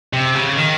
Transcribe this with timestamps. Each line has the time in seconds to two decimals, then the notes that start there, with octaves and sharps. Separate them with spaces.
0.13 C3
0.35 C#3
0.56 D#3